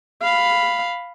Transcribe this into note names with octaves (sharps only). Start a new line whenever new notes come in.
F5 B5